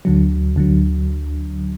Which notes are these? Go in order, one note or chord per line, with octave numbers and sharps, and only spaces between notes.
D2 D3 F#3
D2 D3 F#3